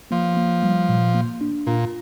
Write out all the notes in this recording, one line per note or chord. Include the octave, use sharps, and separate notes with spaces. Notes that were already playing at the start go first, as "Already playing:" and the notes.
F3 A#3
A#3
G3
A#2
A#3
D4
A#2 F4